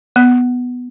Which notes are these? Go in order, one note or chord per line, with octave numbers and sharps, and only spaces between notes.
B3